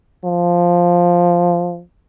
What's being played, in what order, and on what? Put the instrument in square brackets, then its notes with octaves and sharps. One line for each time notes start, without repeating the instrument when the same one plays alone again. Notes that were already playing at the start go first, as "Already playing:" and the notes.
[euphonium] F3